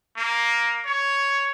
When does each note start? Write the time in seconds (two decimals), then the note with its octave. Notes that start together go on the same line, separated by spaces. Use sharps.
0.17 A#3
0.86 C#5